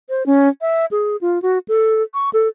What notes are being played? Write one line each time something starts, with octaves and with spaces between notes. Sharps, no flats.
C5
C#4
E5
G#4
F4
F#4
A4
C#6
A4